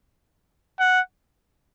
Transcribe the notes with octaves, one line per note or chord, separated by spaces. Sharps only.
F#5